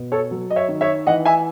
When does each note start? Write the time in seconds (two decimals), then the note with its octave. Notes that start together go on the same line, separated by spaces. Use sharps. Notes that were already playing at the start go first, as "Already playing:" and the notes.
Already playing: B2
0.12 A4 C#5
0.31 F#3
0.51 D#5
0.56 C#5 E5
0.68 D#3
0.81 C#5 E5
1.07 E3 D#5 F#5
1.25 E5 G#5